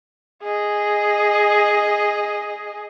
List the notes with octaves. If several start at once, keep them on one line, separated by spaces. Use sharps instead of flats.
G#4 D#5